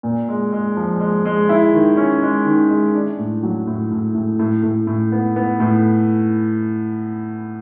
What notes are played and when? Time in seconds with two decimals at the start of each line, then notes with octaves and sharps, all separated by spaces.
0.03 A#2
0.29 G#3
0.52 G#3
0.77 F3
1.00 G#3
1.25 G#3
1.49 E4
1.73 D#3
1.97 C#4
2.22 G#3
2.46 D#3
2.69 G#3
2.94 D4
3.18 A2
3.43 F#3
3.67 A2
3.91 A2
4.14 A2
4.39 A2
4.63 A2
4.87 A2
5.12 B3
5.36 B3
5.60 A2